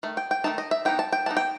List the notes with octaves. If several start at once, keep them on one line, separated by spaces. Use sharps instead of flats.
D#3 A3
G5
G5
D#3 A3 D#4 A5
D#5
E5
E3 B3 D#4 G5
A5
G5
E3 B3 D#4 A5
G5